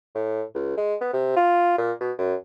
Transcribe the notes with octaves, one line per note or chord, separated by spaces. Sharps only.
A2
C#2
G#3
B3
C3
F4
A#2
B2
F#2